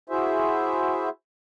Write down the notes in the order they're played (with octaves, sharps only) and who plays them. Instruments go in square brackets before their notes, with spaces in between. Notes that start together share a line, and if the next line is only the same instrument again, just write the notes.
[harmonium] E4 F#4 G#4 C5 E5